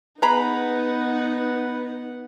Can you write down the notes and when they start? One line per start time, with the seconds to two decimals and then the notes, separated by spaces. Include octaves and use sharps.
0.22 B3 D#4 G#4 B4 F#5 A#5 B5